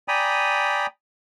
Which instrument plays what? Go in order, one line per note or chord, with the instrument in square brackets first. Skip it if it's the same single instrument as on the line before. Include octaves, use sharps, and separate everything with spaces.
[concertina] D5 G5 G#5 A#5 B5 D#6